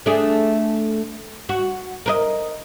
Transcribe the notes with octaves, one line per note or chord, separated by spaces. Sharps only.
A3 D4 G#4
F#4
A#4 B4 D#5